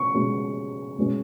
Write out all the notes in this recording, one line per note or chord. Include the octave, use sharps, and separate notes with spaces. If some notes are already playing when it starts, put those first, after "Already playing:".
Already playing: B2 C#4 C#6
B2 G#3 C#4
B2 G#3 C#4